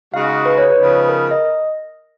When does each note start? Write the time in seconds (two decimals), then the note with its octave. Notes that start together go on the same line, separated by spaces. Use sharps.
0.13 C#3 G#3 D#4 F#4 F5
0.45 B4
0.58 C#5
0.70 B4
0.77 C#3 F3 B3 D#4
1.09 A#4
1.31 D#5